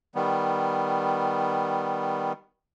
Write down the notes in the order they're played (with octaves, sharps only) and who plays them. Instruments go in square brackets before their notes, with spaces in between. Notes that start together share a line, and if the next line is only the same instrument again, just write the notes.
[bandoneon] D#3 G3 B3